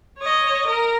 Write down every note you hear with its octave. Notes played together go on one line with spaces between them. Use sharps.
C#5 D#5
A#4